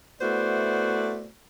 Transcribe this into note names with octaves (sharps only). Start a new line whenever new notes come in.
A3 B3 E4 F#4 C5 D5